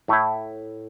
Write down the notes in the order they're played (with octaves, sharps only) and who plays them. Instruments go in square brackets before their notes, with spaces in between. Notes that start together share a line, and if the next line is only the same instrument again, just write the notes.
[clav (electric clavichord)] A2 A3 E4